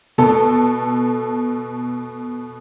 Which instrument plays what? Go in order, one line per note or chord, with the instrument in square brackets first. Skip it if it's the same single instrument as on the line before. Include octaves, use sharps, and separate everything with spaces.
[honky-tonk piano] B2 A4